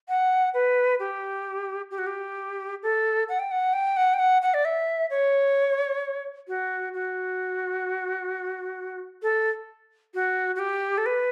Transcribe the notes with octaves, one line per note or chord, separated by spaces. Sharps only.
F#5
B4
G4
G4
F#4
G4
A4
F#5
G5
F#5
G5
F#5
G5
F#5
F#5
D5
E5
C#5
F#4
F#4
A4
F#4
F#4
G4
A4
B4